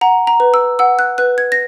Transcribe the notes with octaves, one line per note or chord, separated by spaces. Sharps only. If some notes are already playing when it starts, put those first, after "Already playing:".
F#5 A#5
A#5
B4
E6
F#5 E6
F#6
B4 F#6
G#6
A#6